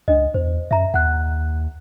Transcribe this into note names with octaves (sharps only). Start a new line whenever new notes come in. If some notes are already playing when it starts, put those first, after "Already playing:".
C#2 D4 D#5
E2 C5
F#2 E5 A#5
D#2 F#5 F#6